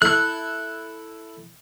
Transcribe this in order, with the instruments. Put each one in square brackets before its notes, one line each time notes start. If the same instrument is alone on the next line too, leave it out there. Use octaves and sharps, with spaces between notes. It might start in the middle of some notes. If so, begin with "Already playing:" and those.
[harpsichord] E4 A4 [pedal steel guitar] F#6